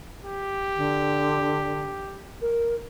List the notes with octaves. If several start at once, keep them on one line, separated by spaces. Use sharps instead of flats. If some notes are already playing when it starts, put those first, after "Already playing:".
G4
D3
A#4